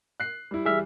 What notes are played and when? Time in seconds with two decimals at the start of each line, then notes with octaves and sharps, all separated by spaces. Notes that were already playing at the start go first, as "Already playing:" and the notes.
0.20 F#6 C7
0.51 G3 E4
0.65 E3 G3 G#4 E5 F6